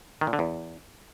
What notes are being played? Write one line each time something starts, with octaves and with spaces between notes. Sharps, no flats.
D#3
A#2
D3
E2